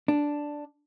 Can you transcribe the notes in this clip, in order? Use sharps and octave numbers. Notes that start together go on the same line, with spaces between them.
D4